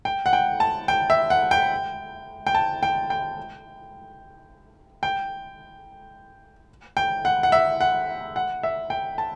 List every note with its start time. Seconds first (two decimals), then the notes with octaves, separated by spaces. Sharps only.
0.05 G5
0.26 F#5
0.33 G5
0.60 A5
0.88 G5
1.10 E5
1.30 F#5
1.51 G5
2.47 G5
2.55 A5
2.83 G5
3.10 G5
5.03 G5
6.97 G5
7.25 F#5
7.43 F#5
7.52 E5
7.81 F#5
8.36 F#5
8.63 E5
8.90 G5
9.18 A5